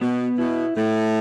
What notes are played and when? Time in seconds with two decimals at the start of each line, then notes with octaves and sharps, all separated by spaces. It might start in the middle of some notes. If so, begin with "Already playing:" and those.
0.01 B2 B3
0.38 B2 E4
0.76 A2 A3